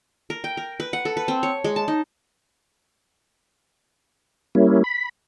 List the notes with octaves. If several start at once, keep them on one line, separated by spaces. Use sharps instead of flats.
A#4
G5
A#4
B4
F#5
A4
B4
C4
C#5
G#3
A5
D#4
G3 A#3 C#4 E4
B5